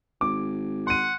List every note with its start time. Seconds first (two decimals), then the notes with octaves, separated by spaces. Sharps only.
0.21 G#1 D6
0.87 F#5 C6 D#7